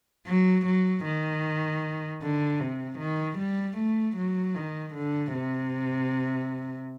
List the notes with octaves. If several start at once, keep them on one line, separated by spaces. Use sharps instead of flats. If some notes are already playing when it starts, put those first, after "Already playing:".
F#3
F#3
D#3
D3
C3
D#3
G3
A3
F#3
D#3
D3
C3